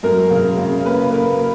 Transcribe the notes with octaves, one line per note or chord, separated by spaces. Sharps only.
F#2 A#4
C#3
C#3
A#3 B4
A#3 A#4